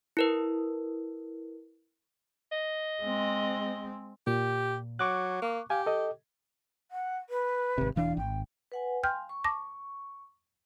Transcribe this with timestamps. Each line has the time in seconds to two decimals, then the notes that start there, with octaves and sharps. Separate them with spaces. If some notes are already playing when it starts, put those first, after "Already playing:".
0.17 E4 A#4 B4
2.52 D#5
3.02 G#3 C4
4.27 A#2 G4
4.99 F#3 C#6 D6 F#6
5.42 A#3
5.70 G4 F5 G#5
5.86 A4 D#5
6.91 F#5
7.29 B4
7.78 G#1 C3
7.96 E1 E3 D4 F5
8.17 G#1 G5
8.72 B4 F#5 G#5
9.03 F5 G5 G#5 C6 F6 G6
9.29 C#6
9.44 A5 D6 A#6